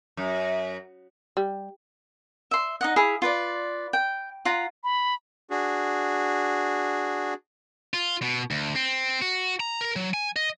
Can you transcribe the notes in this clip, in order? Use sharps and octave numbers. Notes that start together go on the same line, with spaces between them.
F#2
G3
E5 C6
D#4 D#5 F#5
E4 G#4 F5 B5
F4 B4 D5
G5
F4 F#5 A#5
B5
D4 F#4 G#4
F4
B2
D2
C4
F#4
A#5
A#4
F#3
G#5
D#5